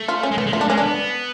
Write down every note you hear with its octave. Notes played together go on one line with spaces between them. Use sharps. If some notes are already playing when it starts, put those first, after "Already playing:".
Already playing: A3
F4
C#4
G#3
A3 B3
G#3
A3 F4
D4
G#3 C#4
B3 D4